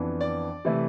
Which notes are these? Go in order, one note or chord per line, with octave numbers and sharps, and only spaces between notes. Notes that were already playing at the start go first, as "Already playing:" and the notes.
Already playing: F2 E3 B3 D4
D5
C3 E3 A3 E4